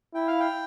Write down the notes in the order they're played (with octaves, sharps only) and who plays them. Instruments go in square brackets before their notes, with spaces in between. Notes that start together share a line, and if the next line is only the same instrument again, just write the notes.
[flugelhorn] E4 [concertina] G5
[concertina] F5
G5